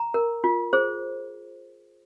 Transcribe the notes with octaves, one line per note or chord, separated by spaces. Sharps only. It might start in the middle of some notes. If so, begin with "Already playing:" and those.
Already playing: A#5
A#4
F4
G#4 C5